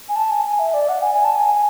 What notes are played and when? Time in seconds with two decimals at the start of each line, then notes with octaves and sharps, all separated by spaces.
0.09 G#5
0.16 A5
0.31 G#5
0.45 G#5
0.59 E5
0.74 D5
0.89 F#5
1.02 G#5
1.14 G#5
1.24 A5
1.36 G#5
1.46 G#5